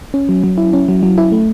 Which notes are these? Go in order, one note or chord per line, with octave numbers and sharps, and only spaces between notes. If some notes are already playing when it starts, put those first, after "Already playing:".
C#4
F#3
F#3
E4
C#4
F#3
F#3
E4
A3